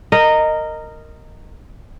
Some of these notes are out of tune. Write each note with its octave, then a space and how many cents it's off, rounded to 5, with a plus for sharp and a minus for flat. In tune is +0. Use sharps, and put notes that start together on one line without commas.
A#4 -15 D#5 -5